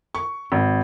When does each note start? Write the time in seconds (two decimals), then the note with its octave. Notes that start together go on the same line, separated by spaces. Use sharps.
0.15 C#6
0.52 G#1